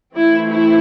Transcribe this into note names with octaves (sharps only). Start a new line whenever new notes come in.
E3 A3 C4 E4
E4